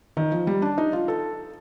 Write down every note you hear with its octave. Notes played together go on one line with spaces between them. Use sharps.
D#3
F3
G3
D4
D#4
F4
A4